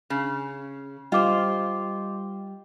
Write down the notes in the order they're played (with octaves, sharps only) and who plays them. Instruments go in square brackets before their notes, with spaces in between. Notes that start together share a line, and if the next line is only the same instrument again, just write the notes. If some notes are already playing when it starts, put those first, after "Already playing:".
[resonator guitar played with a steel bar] C#3
[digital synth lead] G3 [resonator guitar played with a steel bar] F4 C5 [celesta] D#5 D6